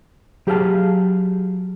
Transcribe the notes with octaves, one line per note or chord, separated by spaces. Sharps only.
F#3 G4 G#4 E5 F5 A5